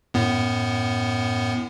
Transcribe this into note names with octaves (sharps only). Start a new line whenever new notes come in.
F#2 A2 B3